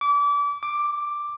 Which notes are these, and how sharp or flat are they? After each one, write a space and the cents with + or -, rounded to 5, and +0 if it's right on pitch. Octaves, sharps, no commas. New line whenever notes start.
D6 -30
D6 +5